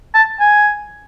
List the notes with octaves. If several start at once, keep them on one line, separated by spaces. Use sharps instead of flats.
A5
G#5